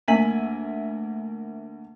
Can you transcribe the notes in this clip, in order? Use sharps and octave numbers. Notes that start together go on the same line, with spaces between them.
D2 A#3 E5 G#5 B6 F#7